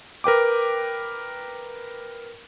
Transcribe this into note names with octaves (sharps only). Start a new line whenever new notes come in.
A#4 B4 G5 D6